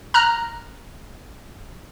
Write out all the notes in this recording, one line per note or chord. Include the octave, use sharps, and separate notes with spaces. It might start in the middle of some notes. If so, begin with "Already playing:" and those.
A#5 F6 F#6